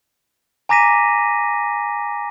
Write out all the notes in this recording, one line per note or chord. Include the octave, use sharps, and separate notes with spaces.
G#5 A#5 D6 A#6 B6 D#7